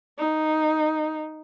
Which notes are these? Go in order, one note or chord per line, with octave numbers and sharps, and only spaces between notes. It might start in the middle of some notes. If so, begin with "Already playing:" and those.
D#4